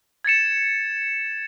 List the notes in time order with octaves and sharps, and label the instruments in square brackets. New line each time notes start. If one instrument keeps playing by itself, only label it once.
[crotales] G#6 A6 C#7 E7